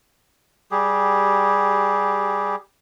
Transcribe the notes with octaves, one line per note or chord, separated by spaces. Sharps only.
G3 G4 G#4